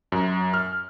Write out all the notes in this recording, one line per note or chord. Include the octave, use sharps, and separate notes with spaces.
F#2
F6